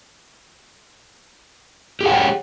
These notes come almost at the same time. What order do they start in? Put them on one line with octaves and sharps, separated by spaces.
G4 G#4 F#5 G5 C#5